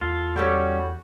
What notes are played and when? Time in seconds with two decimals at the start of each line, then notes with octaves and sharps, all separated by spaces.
0.01 E2 F4 A4
0.36 G3 C#4 F#4 G4 A4 C#5